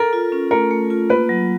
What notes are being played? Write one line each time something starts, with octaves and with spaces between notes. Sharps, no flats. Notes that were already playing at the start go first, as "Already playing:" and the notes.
Already playing: A4 A#4
F4
C#4
A3 A#4
A3
F4
A#3 B4
F#3